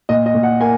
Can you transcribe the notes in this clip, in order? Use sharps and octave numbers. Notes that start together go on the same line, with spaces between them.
A#2 D#5
D#5
A#2
F#5
A#3 G#5